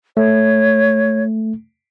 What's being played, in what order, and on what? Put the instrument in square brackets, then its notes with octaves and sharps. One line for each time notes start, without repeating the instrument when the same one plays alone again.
[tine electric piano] A3 [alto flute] C#5